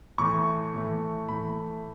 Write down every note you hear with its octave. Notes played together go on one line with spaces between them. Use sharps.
A2 E3 A3 C#6
A2 E3 A3
A2 E3 A3 B5